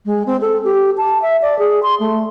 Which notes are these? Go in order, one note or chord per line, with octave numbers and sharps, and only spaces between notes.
G#3
C4
A4
G4
A5
E5
D5
G#4
C6
A3